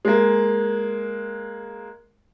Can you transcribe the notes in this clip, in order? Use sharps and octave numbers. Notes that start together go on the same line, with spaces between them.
G#3 A#3